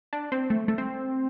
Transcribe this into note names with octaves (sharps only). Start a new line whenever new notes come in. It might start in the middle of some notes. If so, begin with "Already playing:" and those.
D4
C4
A3
A3
C4